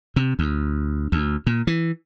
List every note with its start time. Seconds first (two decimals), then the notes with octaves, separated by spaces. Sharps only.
0.16 C3
0.39 D2
1.12 D2
1.47 A#2
1.67 E3